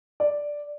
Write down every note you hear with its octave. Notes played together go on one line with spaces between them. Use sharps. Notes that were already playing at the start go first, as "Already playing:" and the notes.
D5